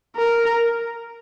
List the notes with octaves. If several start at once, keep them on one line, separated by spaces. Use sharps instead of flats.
A#4